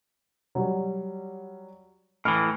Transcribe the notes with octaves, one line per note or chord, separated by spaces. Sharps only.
F#3 G3
A2 E3 F6